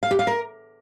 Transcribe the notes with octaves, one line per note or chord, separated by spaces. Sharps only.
F5
G4
F5
A#4